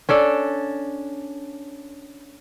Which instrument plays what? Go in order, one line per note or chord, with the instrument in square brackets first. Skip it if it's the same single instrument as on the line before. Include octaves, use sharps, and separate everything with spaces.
[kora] C#4 D4 A4 D5